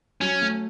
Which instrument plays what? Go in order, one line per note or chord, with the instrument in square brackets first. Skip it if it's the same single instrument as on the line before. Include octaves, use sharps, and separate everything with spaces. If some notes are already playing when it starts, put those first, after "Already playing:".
[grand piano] F#3 [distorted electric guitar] C#4
[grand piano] A3